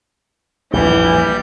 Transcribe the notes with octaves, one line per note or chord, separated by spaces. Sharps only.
A#1 F2 A2 E3 G3 G6